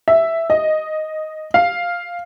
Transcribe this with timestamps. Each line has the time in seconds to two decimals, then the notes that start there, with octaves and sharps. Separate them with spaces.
0.08 E5
0.50 D#5
1.54 F5